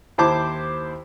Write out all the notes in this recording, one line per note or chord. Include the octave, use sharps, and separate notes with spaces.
D#2 E4 C5 A5 D6